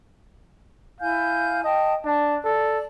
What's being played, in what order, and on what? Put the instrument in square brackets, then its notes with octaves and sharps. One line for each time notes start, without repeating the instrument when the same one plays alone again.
[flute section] E4 G#5 G6 [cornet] F5
[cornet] D#5 [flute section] G5 A5
[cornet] D4 [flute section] A5
[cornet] A4 [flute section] D5